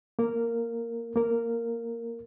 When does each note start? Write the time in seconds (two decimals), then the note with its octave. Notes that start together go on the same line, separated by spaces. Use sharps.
0.19 A#3 A#4
1.16 A#3 A#4